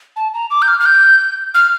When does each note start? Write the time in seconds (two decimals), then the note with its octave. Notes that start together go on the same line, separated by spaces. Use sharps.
0.16 A5
0.34 A#5
0.51 D6
0.62 G6
0.68 F6
0.80 F6
0.86 G6
1.55 F6